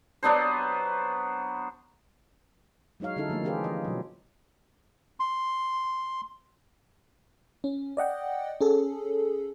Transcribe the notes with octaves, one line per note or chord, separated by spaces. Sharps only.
F#3 B3 D4 C5
F#3 G#3 D#4 C#5 F5
D3 G3 C#4 D#4 E4 A4
F3 G3 A3 A#3 D#4
E3 C#4 F4 G4 G#4 B4
E3 D#5
B2 F#3
C6
C#4
D5 D#5 F#5 G5
C#4 G#4 A4